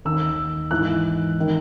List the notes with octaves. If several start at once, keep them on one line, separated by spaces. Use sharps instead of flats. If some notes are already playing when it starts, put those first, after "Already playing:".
D#2 D#3 E6
G#2 E3 F#6
D#3